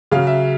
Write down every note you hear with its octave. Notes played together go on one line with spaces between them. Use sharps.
C#3 F#3 F5
E5